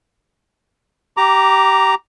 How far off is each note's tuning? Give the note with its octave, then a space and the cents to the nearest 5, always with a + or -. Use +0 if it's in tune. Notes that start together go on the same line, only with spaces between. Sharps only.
G4 -20 A#5 +0 D6 +0